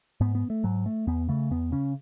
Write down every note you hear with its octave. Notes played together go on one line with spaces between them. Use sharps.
G#2 B3
B3
A3
G#2 F#3
A3
E2 B3
C#3 A3
E2 B3
C#3 C#4